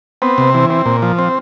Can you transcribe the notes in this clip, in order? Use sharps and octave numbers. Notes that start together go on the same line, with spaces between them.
B3 C4
C3
E3
C4
A#2
F3
C4